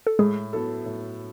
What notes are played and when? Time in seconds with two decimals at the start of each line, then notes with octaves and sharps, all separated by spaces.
0.07 A4
0.19 A2 G#3 G#4
0.53 F#3 B3 E4 A4
0.86 A2